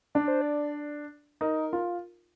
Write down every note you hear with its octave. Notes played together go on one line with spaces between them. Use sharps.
D4 D5
C5
D5
D#4 A#4
F4